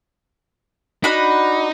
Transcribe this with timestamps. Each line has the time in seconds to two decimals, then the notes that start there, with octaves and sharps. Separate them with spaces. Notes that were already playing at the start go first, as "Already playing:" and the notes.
1.04 D4 D#4 F#4 B5